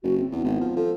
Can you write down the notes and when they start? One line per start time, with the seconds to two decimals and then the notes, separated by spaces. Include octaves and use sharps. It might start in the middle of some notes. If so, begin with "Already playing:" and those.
0.03 F#1 F#4
0.18 C4
0.32 E2 B3
0.44 G#1
0.61 F3
0.76 F3 A4